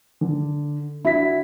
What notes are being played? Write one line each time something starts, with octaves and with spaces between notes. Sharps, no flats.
D3
D4 E4 F#4 B6